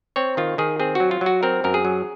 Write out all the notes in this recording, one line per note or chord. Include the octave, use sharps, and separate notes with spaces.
C4 C#5
D#3 F4
D#3 G#4
C4 G#4
F#3 F#4
F4
F#3
F#4
C4 A#4
F#2 A#4
G#4
F#3